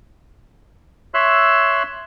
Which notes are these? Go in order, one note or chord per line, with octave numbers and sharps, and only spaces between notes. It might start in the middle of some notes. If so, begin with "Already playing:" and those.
C#5 E5 C6 E6 F#6